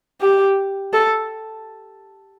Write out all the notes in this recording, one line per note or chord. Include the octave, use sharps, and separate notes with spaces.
G4
A4